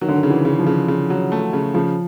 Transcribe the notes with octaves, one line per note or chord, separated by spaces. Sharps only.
D#3 F#3
D3
D#3
C#3
E3
C#3
F3
C#3
C#3
F#3
A3
C#3
C#3 F3